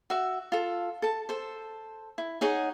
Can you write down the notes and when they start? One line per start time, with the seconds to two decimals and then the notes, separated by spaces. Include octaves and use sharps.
0.10 F#4 E5
0.52 F4 A4
1.02 A4 A5
1.29 A4 C5
2.18 E4
2.41 D#4 G#4 C#5 F#5